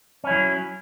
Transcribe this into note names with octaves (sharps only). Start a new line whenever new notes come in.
F#3 C#4 E4